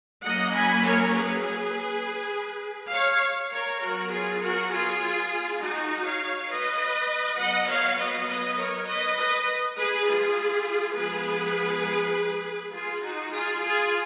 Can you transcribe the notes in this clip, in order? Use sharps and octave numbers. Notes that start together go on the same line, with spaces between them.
F#3 A#3 C#4 D#5 F#5
G#5 B5
A#4 C#5
G#4 B4
C#5 F5
A#4 C#5
F#3 B3 F#4 A#4
F4 G#4
F#4 A#4
F4 G#4
D#4 F#4
C#5 F5
B4 D#5
F#3 B3 D#5 F#5
C#5 F5
B4 D#5
B4 D#5
A#4 C#5
B4 D#5
B4 D#5
G#4 B4
F4 G#4
F3 G#3 B3 G#4 B4
F4 G#4
D#4 F#4
F4 G#4
F4 G#4